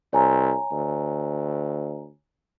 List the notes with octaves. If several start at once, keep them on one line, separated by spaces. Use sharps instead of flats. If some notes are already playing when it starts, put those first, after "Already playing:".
C2 C#5 G#5 A#5
D2